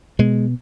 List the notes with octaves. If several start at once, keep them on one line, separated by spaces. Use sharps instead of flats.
B2 G#3